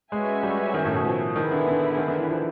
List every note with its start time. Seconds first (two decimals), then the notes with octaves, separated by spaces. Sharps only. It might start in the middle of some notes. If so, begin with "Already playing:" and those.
0.12 G#3 C#4 F#4 B4 E5 G#5
0.43 G3
0.74 D#3
0.85 A2
0.94 B2
1.05 F3
1.36 D#3 B3 E4 G#4 B4
1.51 D3
1.68 D3
1.98 D#3
2.08 D3
2.18 E3
2.29 F3